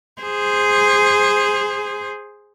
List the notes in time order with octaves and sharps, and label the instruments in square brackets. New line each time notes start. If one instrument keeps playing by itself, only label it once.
[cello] G#4 C5